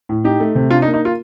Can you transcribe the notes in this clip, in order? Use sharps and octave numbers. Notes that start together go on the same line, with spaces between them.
A2
D#4 G4
A3
C3
D4 F4
D#4
A#3
D#4
F4